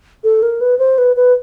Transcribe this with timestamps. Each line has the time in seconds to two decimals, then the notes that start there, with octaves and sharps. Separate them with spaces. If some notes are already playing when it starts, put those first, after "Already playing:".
0.24 A4
0.42 A#4
0.61 B4
0.79 C5
0.98 B4
1.16 B4